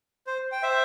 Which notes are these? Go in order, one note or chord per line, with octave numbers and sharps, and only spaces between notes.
C5
G5
C5 E5